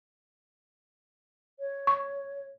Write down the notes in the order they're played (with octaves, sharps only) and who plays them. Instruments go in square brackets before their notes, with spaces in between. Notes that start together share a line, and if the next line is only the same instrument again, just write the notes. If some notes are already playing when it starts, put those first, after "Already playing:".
[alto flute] C#5
[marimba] C#6